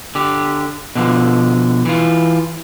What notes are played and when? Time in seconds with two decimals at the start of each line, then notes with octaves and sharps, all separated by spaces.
0.15 D3 G4
0.95 B2 D3 F3
1.86 E3 F4